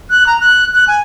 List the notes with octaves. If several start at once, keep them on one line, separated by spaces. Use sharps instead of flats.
F#6
A#5
F#6
F#6
G#5